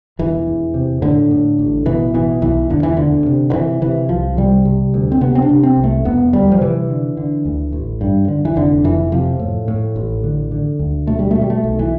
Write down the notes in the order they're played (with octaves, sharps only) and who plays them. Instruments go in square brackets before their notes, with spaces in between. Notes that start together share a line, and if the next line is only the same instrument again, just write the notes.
[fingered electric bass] E1 E3
E2
C3
A2 D3
A2
A1
B2 E3
B2 E3
B1 E3
E1 D3
E3
D2 D3
C3
D3
C3 E3
C3 E3
C2 F3
C3 G3
C3
D2
C4
C3 B3
C4
D4
C3
C4
C2
A3
E1 B3
D2 G3
F3
C3 E3
D3
D3
D2
A1
G2
D3
E3
F1 D3
F2 E3
C3 F3
A2
A2
A1
D3
D3
D2
B2 A3
G3
B2 A3
G3
A3
B1
E3